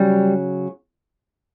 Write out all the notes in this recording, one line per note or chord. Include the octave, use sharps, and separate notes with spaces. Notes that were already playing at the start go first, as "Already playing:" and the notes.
Already playing: C#3 F#3 G3